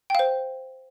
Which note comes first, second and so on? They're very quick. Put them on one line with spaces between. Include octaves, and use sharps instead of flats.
G5 F5 C5